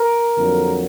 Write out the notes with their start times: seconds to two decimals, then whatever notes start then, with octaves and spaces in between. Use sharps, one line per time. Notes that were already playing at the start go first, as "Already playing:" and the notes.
Already playing: A#4
0.36 F2 D3 F#3 A#3